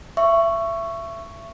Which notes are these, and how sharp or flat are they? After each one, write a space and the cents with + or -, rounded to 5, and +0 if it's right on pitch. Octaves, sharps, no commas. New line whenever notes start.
E5 +25 C#6 +0